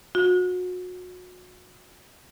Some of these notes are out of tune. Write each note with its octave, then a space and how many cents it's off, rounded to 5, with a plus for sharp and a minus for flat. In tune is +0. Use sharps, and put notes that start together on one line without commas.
F#4 -30